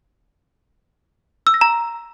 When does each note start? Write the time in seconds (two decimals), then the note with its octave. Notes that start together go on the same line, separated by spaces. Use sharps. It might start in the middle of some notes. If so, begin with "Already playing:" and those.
1.47 E6
1.54 A#6
1.61 A#5